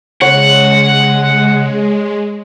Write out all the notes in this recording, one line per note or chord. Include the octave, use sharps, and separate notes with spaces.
C#3 G#3 C#5 F#5